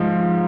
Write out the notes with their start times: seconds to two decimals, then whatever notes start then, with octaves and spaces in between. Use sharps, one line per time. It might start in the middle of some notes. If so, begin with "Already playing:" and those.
Already playing: G#2 F3